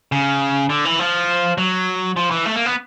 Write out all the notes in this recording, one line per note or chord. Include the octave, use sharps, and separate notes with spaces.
C#3
D3
E3
F3
F#3
F3
E3
A3
A#3
B3